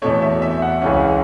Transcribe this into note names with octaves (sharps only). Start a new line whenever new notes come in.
E2 B2 A3 C#5
E5
E5
F#5
C#2 C#3 E3 C#4